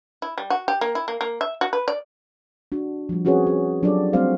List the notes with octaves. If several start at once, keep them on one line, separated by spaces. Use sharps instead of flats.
E4
G3
F#4
G4
A#3
E4
A#3
A#3
E5
F#4
B4
D5
D4 F#4
F3 G3
C4 C#4 F#4 G#4 B4 C#5
G#4
F#3 D4 F4 G4 A4 D5
G3 A3 C4 F#4 C5 F5